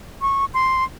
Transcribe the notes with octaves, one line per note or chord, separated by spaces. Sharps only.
C#6
C6